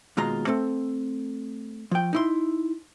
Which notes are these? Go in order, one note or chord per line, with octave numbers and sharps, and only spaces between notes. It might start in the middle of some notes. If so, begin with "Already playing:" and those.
D#2 B2 G#3 F4 A#5
A3 C4 A4
F3 G5
D#4 E4 C6